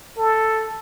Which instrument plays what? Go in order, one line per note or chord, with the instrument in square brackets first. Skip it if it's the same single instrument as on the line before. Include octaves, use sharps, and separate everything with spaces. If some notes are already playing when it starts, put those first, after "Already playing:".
[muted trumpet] A4